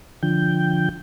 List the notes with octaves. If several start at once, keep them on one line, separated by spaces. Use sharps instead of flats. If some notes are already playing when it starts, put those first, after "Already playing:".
D3 F3 G5